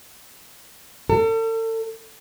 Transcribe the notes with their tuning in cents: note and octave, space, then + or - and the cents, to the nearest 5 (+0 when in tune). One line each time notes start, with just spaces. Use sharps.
A4 +40